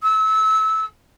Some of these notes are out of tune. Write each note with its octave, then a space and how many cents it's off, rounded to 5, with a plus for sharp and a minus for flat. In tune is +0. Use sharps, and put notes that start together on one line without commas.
E6 -25